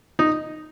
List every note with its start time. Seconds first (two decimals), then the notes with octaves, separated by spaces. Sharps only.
0.19 D#4